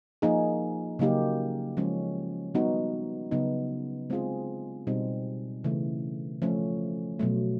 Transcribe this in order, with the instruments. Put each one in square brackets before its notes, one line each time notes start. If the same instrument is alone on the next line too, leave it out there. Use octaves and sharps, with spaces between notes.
[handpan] F3 A#3 D#4 G#4
C#3 F#3 A#3 D#4 G4
F3 G#3 C#4
G3 B3 D#4 F#4
C#3 F#3 B3 D#4
G#3 C4 F4 G#4
B2 G3 C4 D#4
C#3 E3 A3
F3 A3 C#4
B2 F#3 A3